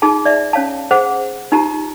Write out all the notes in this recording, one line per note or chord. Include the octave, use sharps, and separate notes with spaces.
D#4 F4 G#4 A5
D5 E5
C#4 C#5 F5 A5
G#4 C5 F#5
D#4 F4 G4 A5 A#5